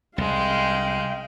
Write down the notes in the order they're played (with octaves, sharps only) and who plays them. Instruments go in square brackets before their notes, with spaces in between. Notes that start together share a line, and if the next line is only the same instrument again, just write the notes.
[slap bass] C2 [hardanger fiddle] G#3 [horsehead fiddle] F5 G5